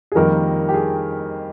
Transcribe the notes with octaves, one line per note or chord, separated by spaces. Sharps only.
G#4
F2 D#3 G3 A#3 A#4
G4
G#4